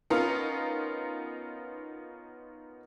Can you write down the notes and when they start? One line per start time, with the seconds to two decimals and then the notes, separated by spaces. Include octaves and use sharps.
0.10 B3 C#4 D#4 F4 A#4